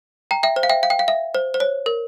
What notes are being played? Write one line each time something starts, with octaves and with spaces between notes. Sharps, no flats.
G5 A#5
E5 G5
C5
F5
E5 G5
F5
G5
F5
E5
C5
C5
C#5
A#4